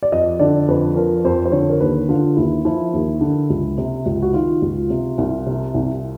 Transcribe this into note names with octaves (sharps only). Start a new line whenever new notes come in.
D5
F2 D#5
D3 D5
F2 B4
F3 A#4
F2 C5
C5
D3 C#5
A#4
D#2 B4
D3 F4
D#2 E4
F3 E4
D#2
D3
C#2
C3
C#2
F#4
D#3 F4
C#2
C3
C2
C3
C2